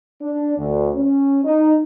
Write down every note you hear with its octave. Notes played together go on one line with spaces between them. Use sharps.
D4
D2
C#4
D#4